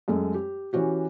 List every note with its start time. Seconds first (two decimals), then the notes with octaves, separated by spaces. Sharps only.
0.08 F#2 G#3 A3
0.34 G4
0.73 E3 C#4 F#4 G4